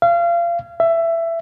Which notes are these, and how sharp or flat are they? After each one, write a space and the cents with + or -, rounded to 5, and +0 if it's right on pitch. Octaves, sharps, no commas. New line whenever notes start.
F5 -30
E5 +15